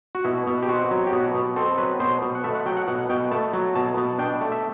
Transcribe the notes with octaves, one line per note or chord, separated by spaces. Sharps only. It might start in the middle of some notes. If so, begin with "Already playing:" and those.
F#4
B2 E4
B2
G4
C4 F#4
F#3
G4
B2 F#4
B2
C4 A4
F#3 B4
B2 C5
B2
F#5
A3 E5
F#5
F#3 G5
F#5
B2 F#5
B2 G5
A3 A5
F#3
B2 A5
B2
D4 G5
A3
E5